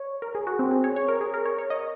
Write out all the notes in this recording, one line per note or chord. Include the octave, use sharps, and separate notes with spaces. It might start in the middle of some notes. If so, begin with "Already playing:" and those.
Already playing: C#5
A#4
G#4
F#4
C4
G#4
C#5
C#5
A#4
G#4
A#4
C#5
C#5
D#5